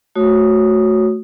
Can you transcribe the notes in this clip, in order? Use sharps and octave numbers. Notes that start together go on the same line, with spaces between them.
A3 F#4 C#5 D#6